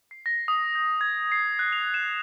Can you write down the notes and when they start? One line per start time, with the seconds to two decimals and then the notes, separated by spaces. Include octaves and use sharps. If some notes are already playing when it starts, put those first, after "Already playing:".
0.11 C7
0.26 A#6
0.48 D#6
0.75 G6
1.01 G#6
1.32 C7
1.59 F#6
1.72 F7
1.94 E7